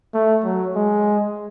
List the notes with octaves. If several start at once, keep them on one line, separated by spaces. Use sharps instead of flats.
A3
F#3
G#3